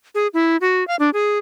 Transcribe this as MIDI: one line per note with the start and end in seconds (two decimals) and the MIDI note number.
0.15 0.27 68
0.34 0.57 64
0.61 0.86 66
0.88 0.96 77
0.99 1.10 62
1.13 1.38 68